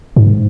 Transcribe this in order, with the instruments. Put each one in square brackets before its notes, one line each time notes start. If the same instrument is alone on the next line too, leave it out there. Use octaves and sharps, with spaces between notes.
[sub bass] G#2